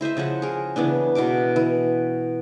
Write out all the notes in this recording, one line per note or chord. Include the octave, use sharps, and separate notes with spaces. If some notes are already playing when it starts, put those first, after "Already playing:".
E4 C5 D#5 E5
C#3 F3 C5 F#5
G#4 A#4
C#3 E3 B3 D4
B2 E3 A#4 D6
E3